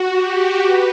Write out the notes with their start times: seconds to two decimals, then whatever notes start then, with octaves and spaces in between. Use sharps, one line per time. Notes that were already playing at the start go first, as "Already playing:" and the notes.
Already playing: F#4
0.11 G4
0.62 B4